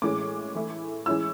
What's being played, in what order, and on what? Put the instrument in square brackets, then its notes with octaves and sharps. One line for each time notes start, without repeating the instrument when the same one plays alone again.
[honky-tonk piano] A2 E3 G#3 C#4 D6
E3 A3 E4
E3 G#3 C#4 E4 E6